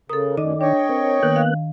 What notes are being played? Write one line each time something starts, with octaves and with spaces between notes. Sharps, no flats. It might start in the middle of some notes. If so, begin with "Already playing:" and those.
C#3 A4 A#4 D#6
F#2 A2 D#3 D5 D#5
D4 C#5 D#5 G5
C4 A#4
D#3 A#3 B3 F#6
F5